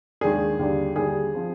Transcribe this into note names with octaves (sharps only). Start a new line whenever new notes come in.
D#2 D#3 G#3 D4 G#4
D#2 D3 G3 D4
D#2 D3 G3 D4 G#4
F3 C4 F4